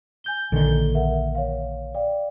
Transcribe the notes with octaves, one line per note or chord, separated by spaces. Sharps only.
G#5 G6 G7
A#1 D3 D#3 A4 G7
A#4 E5 F#5
C#5 F5
D5 F5 G5